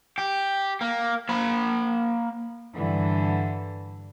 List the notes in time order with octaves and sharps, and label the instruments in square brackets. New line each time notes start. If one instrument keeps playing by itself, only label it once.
[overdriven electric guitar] G4
A#3
A#3 B5
[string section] G2 D3 E3